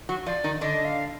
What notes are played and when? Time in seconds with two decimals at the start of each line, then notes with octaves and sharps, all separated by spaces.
0.09 F#3 F#4
0.26 F3 F4 D5
0.44 D#3 D#4
0.61 D3 D4 D#5
0.85 F5